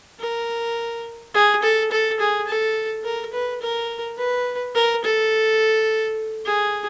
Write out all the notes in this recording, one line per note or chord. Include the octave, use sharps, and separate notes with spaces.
A#4
G#4
A4
A4
G#4
A4
A#4
B4
A#4
B4
A#4
A4
G#4